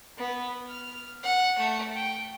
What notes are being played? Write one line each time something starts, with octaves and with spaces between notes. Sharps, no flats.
B3
F6
F#5
A3
G5